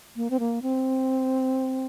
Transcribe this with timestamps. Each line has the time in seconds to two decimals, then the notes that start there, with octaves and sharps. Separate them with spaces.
0.16 A#3
0.30 C4
0.40 A#3
0.62 C4